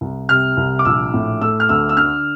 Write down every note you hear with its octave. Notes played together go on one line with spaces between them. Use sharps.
C2
C3 F6
C2
D6
A#1 E6
A2
A3 E6
F6
D2 E6
E6
D3 F6